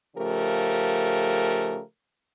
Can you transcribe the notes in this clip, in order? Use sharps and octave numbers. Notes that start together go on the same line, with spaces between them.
C#3 F3 A3 G4 A#4